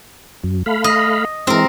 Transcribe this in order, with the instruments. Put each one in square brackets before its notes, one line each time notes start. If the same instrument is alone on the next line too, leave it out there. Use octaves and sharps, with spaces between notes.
[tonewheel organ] F#2
A3 F5 B5
[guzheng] D#5
[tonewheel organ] E3 G#3 [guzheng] C4 A#4